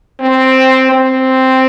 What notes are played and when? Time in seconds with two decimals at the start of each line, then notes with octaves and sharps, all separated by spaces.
0.21 C4
0.92 C4